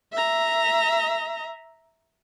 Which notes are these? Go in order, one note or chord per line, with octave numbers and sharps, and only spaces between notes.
E5 A#5